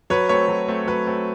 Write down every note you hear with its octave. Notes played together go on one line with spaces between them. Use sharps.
F#3 B4 C#5
A3 C4 B4 C#5
F#3
A3 C4
F#3 B4
A3 C4